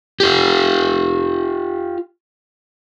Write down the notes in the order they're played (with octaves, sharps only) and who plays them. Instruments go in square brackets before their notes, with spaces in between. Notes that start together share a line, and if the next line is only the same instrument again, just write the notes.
[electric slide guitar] F4 G4